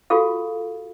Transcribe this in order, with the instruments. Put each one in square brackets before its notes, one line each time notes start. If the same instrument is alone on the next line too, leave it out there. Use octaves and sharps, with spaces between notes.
[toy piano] F4 F#4 G#4 A4 F5